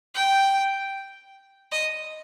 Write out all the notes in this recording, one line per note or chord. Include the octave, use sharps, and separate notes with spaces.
G5
D#5